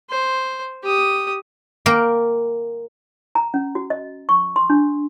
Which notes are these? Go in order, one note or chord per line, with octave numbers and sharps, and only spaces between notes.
C5
G4 D#6
A#3 A#4 G5
A#5
C#4
F#4
D#5
C#6
C6
D4